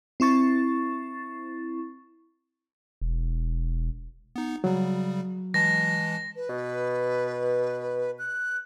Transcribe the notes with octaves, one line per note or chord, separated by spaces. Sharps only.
C4 E4 C#6 A6
E1
B3 D#4
C#3 F#3 G3
E3 G#3 A5 A#6
B4
B2
F#6